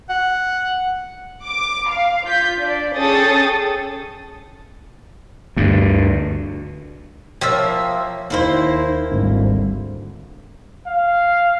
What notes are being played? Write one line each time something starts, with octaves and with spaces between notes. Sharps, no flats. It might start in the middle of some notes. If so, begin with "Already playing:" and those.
F#5
D6
F5
F4 G6 B6
D4 D5
C#4 G#4 A4 G5 D#6 A6
D2 G2
F3 A#3 C#5 E5 G5
D#2 A#3 D#4 E4 C5
G#1 D2 G3
F5